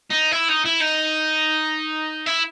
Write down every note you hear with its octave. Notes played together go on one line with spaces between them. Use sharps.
D#4
E4
D#4
E4
D#4
E4